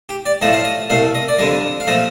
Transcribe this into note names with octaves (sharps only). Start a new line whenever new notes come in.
G4
D5
A2 F3 A3 D#5
F5
D#5
C2 A#2 A3 F5
D#5
D5
F2 D3 G3 D#5
F5
A#2 F3 A3 D#5